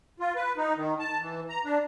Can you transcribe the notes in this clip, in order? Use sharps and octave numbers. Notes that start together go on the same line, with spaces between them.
F4
B4
D#4
D#3
A5
E3
A#5
D4